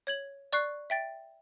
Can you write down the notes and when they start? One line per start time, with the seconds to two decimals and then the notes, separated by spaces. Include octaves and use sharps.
0.07 C#5 G#6 F#7
0.53 D5 C#6 F#6 C7
0.90 E5 G5 A6